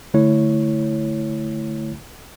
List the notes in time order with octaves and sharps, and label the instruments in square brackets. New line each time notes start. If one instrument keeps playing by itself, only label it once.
[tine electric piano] D3 A3 E4 C#5